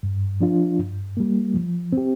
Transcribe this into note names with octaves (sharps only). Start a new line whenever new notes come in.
G2
F3 D4 F4
G2
G3 A#3
F3
C4 G4